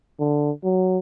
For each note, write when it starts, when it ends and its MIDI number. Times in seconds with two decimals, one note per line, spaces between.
0.20 0.51 50
0.64 0.98 54